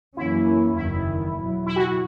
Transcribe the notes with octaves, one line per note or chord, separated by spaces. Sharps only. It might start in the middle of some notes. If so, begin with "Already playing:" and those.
F#2 E3 A#3 C#4 E4
F#1 E2 D#3 E4
E2 B2 F#3
E4
F#4